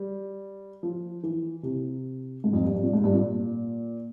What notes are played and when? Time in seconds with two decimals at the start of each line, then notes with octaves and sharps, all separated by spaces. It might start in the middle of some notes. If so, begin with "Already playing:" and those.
Already playing: G3
0.83 F3
1.23 E3
1.63 C3
2.44 G#2
2.53 F2
2.64 G2
2.74 G2
2.84 A#2
2.93 G#2
3.04 G2
3.14 A#2